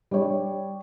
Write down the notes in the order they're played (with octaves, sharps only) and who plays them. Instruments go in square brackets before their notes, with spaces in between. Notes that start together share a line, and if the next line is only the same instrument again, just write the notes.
[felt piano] G3 C#5